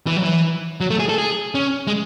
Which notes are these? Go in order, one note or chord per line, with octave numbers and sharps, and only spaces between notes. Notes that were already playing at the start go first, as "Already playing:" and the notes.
E3
F#3
E3
F#3
A3
G#4
A4
G#4
C#4
G#3